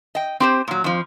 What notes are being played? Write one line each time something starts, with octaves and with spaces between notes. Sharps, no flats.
D#5 G5
C4 G4 C5
A#2 F#3
F2 F3